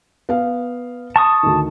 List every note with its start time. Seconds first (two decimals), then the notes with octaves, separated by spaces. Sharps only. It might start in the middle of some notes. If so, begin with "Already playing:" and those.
0.29 B3 F5
1.16 A5 C#6 D#6
1.43 D2 D#3